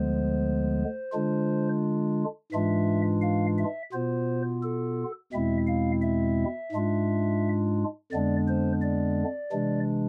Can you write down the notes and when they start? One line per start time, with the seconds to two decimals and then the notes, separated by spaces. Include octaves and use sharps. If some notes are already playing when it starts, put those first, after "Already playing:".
Already playing: D2 D3 F3 G#3 B3 C5
1.12 D3 G#3 D4 F4
2.52 G#2 E3 G#3 D4 F4 E5
3.22 F5
3.58 E5
3.92 B2 B3 F4 C5
4.62 A4
5.32 E2 B2 G#3 C4 E4 E5
5.67 F5
6.01 E5
6.72 G#2 G#3 D4 F4
8.12 F2 D3 G#3 B3 D4 D5
8.47 C5
8.82 D5
9.52 C3 E3 G#3 D4